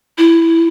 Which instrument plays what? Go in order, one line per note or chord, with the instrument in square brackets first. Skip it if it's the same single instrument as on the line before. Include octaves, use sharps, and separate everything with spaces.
[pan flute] E4